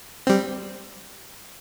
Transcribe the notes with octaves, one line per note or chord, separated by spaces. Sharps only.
G3 C4